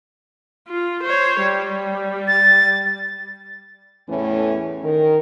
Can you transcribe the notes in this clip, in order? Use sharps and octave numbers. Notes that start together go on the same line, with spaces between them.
F4
C5 C#5
G3
A6
E2 A2 E3 A3 C#4
D#3 A#4